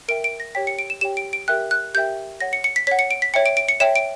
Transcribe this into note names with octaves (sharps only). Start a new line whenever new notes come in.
A#4 E5 G5 D7
D7
A#6
G4 C#5 G5 B6
C#7
D7
E7
G4 C#5 G5 E7
D7
D7
G4 A#4 E5 G5 F#6
F#6
G4 A#4 E5 G5 G6
C#5 F#5 A#6
C#7
C#7
B6
C#5 F#5 B6
C#7
D7
B6
C#5 E5 G5 C#7
D7
D7
C#7
C#5 E5 G5 E7
D7